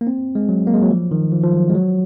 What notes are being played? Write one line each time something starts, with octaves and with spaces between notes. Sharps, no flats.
A#3
C4
G#3
F#3
A#3
G#3
F#3
F3
D#3
F3
F3
F#3
G#3
F#3